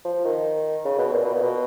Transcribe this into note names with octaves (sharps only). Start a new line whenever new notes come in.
F3
D#3
C#3
B2
A#2
B2
A#2
B2